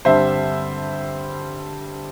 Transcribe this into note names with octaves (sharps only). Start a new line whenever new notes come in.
G2 D3 G3 C4 C5 E5